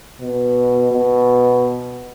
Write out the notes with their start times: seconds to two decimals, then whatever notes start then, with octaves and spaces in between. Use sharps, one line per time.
0.20 B2
0.91 B2